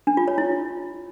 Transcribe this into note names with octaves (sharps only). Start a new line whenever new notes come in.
D4
F4
C#5
E4